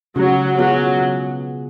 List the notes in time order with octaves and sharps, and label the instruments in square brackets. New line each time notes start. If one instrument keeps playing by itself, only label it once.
[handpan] C#3 [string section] F#3
[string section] F#3 [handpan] G#3 B3 F4 G#4
[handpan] C#3